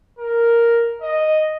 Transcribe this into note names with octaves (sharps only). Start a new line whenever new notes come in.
A#4
D#5